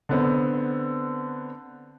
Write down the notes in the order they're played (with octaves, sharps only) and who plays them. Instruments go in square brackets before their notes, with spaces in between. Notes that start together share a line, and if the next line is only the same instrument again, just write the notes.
[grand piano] D3 B3 C4